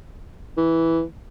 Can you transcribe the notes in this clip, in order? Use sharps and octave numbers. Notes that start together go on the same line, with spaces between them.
E3